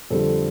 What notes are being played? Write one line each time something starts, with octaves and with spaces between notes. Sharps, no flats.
F2 D3 G3 A4